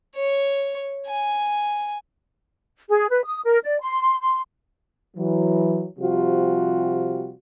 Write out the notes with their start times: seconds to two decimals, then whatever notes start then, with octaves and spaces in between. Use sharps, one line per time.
0.15 C#5
1.06 G#5
2.90 G#4
3.11 B4
3.24 D#6
3.45 A#4
3.64 D5
3.82 C6
4.21 C6
5.16 E3 F#3
5.99 C3 F3 G3 F4 F#4